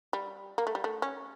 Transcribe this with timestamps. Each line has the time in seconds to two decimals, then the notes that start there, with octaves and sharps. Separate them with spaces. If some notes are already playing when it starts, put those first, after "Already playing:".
0.13 G3
0.58 A#3
0.67 A3
0.75 G3
0.84 A3
1.02 C#4